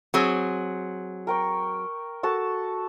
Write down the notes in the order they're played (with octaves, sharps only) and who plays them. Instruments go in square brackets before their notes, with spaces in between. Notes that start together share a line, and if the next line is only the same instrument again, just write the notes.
[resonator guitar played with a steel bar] F#3 C4 G#4
[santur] A#4 G5 C#6
F#4 A4 A5